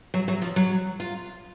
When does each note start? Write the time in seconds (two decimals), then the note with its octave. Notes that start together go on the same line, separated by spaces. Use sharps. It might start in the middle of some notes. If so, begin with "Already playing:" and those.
0.14 F#3
0.28 F#3
0.42 F3
0.56 F#3
1.00 F4